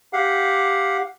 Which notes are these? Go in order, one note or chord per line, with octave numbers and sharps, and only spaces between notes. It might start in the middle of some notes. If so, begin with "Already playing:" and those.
G4 F5 F#5